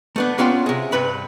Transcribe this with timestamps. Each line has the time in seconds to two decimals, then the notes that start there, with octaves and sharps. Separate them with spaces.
0.16 A3 B3 D4
0.38 A#3 B3 C#4 F4 G5 C6
0.66 C3 G#4
0.92 G2 C3 B4 B5